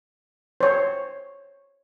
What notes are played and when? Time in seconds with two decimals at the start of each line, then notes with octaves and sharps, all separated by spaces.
0.61 C5 C#5